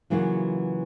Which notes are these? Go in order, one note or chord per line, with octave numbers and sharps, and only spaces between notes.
C#3 E3 F#3 A#3 F4 F#4